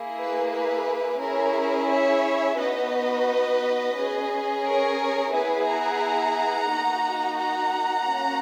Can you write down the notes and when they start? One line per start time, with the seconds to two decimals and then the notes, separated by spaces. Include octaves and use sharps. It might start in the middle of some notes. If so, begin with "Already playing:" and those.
Already playing: A#3 E4 G#4
0.18 B4
0.53 B4
1.20 C#4 E4 G#4 A#4 C#5
1.89 C#5 E5
2.58 B3 D#4 F#4 B4 D#5
3.96 C#4 G#4
4.65 A#4 C#5
5.33 B3 E4 G#4 B4
5.67 F#5 A#5
6.71 A#3 D#4 F#4
7.39 F#5 A#5
8.07 A#3 C#4 F#4